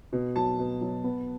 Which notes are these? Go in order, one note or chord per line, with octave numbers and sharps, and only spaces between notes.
B2
F#3 A5
B2
F#3
B3